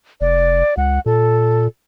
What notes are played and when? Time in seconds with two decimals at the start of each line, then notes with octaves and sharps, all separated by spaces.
0.21 F1 D5
0.77 C#2 F#5
1.06 A#2 A4